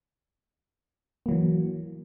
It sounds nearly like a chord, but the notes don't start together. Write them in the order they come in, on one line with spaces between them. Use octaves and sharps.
A#3 F#3 E3